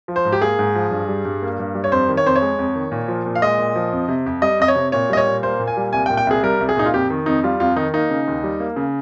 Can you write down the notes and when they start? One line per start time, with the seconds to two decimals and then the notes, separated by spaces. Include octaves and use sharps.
0.08 F3
0.16 C5
0.25 G#2
0.32 G4
0.42 A#3 G#4
0.59 G#2
0.75 F3
0.91 G2
1.08 G3
1.25 G2
1.42 A#3
1.59 G2
1.75 G3
1.84 C#5
1.92 F2 C5
2.08 D#3
2.17 C#5
2.26 F2 C5
2.36 C#5
2.42 G#3
2.59 F2
2.75 D#3
2.92 A#2
3.08 F3
3.26 A#2
3.35 F5
3.42 G#3 D#5
3.58 A#2
3.75 F3
3.92 F2
4.09 C3
4.26 F2
4.42 G3 D#5
4.60 F2 D#5
4.68 C#5
4.76 C3
4.92 A#2 C#5
5.10 G3 D#5
5.17 C#5
5.27 A#2
5.43 A#3 C5
5.59 A#2
5.67 G#5
5.77 G3
5.93 C2 G#5
6.06 G5
6.10 A#2
6.17 G5
6.27 C2 G#4
6.43 G3 A#4
6.60 C2
6.69 G#4
6.77 A#2 D#4
6.86 F4
6.93 F2 G4
7.10 D#3
7.26 F2 D#4
7.44 G3 F4
7.60 F2 F4
7.76 D#3 D#4
7.94 A#3 D#4
8.10 C#3
8.28 D#2
8.44 G3
8.60 A#3
8.76 C#3